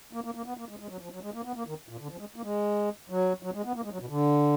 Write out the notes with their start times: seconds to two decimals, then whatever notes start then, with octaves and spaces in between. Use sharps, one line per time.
0.13 A#3
0.24 A#3
0.35 A#3
0.46 B3
0.57 A#3
0.69 G#3
0.79 G#3
0.89 F#3
1.01 F3
1.12 F#3
1.23 G#3
1.34 A#3
1.45 B3
1.56 A#3
1.67 D#3
1.89 A#2
2.00 D3
2.11 F3
2.19 G#3
2.36 A#3
2.43 G#3
3.10 F#3
3.43 F#3
3.54 G#3
3.65 B3
3.76 A#3
3.84 G#3
3.92 F#3
4.00 B2
4.09 D3